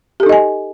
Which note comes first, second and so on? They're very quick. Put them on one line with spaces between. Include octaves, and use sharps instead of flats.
G4 A4 D#4 D#5 G#5